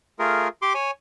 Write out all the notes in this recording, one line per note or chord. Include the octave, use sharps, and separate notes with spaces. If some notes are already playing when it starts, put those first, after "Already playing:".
A3 F4 G#4 A#4
G4 C6 D6
C#5 G#5